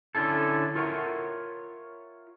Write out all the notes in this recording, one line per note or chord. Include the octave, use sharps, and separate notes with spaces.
D3 C#4 E4 A4
F4 A#4 C#5 E5 F#5